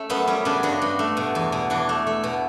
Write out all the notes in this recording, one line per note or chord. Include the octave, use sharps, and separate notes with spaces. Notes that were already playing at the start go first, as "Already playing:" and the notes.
Already playing: A3 C#4
F#2 B3
G3 C#4
C#3 B3 D4
G2 D4 F#4
G2
A3
B2
E2
B2
E3 D4 F#4
A3
A3
B2